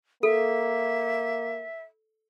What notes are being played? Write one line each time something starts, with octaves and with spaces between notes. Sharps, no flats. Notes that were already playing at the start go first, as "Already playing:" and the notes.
A#3 A4 E5